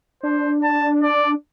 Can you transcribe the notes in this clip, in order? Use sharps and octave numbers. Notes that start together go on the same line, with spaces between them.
D4 C5
A5
D5